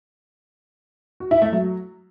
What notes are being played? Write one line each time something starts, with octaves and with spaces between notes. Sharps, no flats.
F#4
E4
A3
F#3